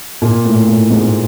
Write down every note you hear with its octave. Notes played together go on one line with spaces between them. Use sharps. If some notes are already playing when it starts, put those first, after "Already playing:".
A#2
A2
A2
G#2